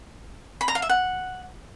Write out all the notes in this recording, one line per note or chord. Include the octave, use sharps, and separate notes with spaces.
B5
A#5
F5
E5
F#5